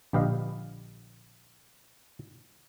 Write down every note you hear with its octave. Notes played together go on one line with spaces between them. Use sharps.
A#1 D3 G4 B4 D#5 F5